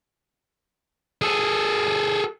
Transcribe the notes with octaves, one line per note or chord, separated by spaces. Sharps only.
G#4 A4